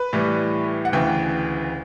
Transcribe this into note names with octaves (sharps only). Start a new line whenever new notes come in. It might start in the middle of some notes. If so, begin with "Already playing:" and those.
Already playing: B4
A2 E3 G3
F#5
D2 C#3 E3 G5